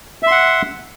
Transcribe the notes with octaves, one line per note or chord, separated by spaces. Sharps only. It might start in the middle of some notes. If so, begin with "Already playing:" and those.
E5 F#5 C6